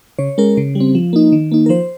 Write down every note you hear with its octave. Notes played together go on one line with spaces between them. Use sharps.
C#3 C#5
G#3 C#4 A#4
C#3
G3
C4
F3
A#3 D#4
D#3
A#3 D#4
A#4
F3 C5